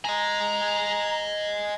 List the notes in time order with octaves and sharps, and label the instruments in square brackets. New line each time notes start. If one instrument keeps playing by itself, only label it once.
[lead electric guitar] D#5 G#5 [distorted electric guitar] A#5